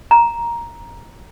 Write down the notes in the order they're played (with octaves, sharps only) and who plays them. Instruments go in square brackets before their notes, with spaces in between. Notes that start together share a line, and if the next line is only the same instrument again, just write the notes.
[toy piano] A#5